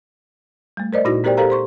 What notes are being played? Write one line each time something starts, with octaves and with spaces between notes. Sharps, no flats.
G3 A3
A#4 C5 D5 D#5
A#2 D#4 E4 F#4 A#6
B3 G4 A#4 C5 D5 G5
G4 A4 A#4 C5 F5 A#5
C5 C6 C#6